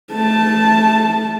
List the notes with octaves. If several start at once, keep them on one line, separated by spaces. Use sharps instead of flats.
A3 A5